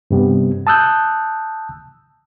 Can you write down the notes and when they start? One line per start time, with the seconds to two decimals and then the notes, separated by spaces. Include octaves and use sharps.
0.11 G2 C3 G3 B3
0.67 A5 D#6 E6 F#6 G6